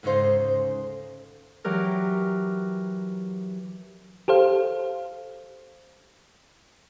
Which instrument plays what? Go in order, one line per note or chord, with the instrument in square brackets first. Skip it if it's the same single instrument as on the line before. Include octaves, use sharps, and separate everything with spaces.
[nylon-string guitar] D2 G#2 C#3 D#4 C5
[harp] E3 F#3 G4 A#4
[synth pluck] G4 A4 C5 F5